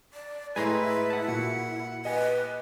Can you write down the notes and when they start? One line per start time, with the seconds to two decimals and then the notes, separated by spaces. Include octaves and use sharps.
0.14 D5
0.56 A2 G#3 E4 B4 G#5 A#5 C6
1.10 F#5 A5
1.28 A#2 F#4 F#5
2.05 G4 B4 D#5 G#5